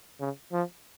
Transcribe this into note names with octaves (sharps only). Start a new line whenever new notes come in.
C#3
F3